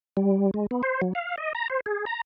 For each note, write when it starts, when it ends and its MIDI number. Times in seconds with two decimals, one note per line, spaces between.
0.17 0.51 55
0.54 0.66 56
0.71 0.82 59
0.83 1.01 72
1.02 1.13 54
1.15 1.36 77
1.38 1.53 75
1.55 1.68 82
1.70 1.80 72
1.86 2.05 68
2.06 2.21 82